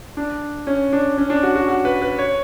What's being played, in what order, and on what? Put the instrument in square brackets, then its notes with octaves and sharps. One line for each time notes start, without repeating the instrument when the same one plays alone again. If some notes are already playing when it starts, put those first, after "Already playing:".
[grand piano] D4
C#4
D4
C#4
D4
F#4
F#4
F#4
B4
B4
C#5